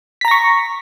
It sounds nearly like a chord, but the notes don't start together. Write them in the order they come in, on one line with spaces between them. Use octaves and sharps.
B6 A#5 A#6 C#6